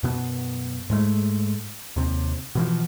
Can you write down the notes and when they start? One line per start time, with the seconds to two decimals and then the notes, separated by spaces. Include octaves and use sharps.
0.03 F#2 B2 B3
0.90 G#2 G#3 A3
1.96 D#2 C3
2.55 B2 E3 F3